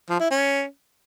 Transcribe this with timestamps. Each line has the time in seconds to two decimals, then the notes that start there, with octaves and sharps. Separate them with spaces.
0.10 F3
0.20 E4
0.31 C#4